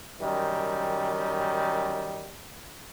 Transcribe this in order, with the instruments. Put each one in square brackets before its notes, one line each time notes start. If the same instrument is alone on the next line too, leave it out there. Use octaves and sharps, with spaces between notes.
[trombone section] F#2 D#3 G3